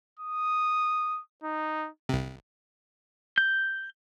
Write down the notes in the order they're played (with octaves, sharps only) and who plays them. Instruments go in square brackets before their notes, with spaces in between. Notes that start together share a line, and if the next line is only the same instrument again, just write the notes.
[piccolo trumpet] D#6
D#4
[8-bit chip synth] C2 C3
[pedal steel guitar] G6